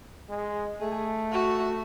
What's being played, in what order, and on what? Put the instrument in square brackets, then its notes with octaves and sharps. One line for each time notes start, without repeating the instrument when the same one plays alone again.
[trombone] G#3
[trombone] A3 [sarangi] G#4
[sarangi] F#4